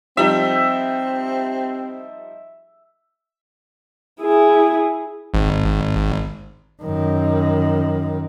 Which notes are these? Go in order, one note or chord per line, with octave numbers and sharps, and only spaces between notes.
F3 G3 C4 D#4 E5
E4 G#4
G#1
F#2 D#3